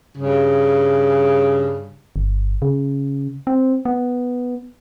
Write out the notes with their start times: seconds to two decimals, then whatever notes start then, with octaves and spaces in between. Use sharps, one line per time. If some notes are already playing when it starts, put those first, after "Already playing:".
0.16 G2 C#3
2.16 G1
2.62 C#3
3.47 C4
3.85 B3